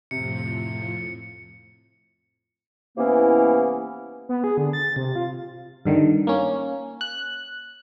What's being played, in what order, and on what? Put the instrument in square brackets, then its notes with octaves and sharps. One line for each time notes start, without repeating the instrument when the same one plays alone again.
[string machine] F2 A2 F3 [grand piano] C3 [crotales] C#7
[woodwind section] C3 E3 A#3 B3 C#4 E4
[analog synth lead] B3
G#4
D3
A6
C3
F4
[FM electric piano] G2 D3 D#3
A#3 C#4
F#6